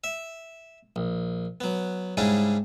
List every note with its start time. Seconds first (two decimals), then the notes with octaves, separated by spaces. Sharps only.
0.04 E5
0.96 A#1
1.61 F#3 B3
2.17 G#2 C#3 G3 D4 E4 G#4